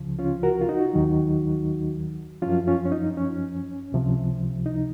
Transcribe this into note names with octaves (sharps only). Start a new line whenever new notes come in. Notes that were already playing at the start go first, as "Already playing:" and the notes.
Already playing: C#2 C#3 F3
C#4 F4
F#4 A#4
F4
D#4 F#4
D#2 D#3 F#3
F#2 F3 C#4 F4
C#4 F4
C#4
D#4
C#4
C#2 C3 F3
D#4